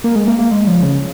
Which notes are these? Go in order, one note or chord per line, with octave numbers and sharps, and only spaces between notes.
A#3
G#3
A#3
A#3
G#3
F3
C#3